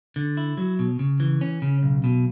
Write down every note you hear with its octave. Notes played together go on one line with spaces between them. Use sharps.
D3
E4
F#3
B2
C#3
E3
C#4
C#3
B1
B2